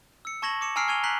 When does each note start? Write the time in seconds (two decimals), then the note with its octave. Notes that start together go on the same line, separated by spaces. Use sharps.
0.25 E6 C#7
0.42 A5 C#6 G#6 A#6 E7 F#7
0.61 D6 C#7 E7
0.76 G#5 A#5 E6 F6 C7 D7
0.88 G#5 C#6 G#6 D#7 F7 G7
1.04 A#5 F#6 B6 C7 F#7